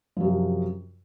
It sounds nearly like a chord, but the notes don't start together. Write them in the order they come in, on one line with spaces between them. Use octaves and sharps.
F3 F#2 C3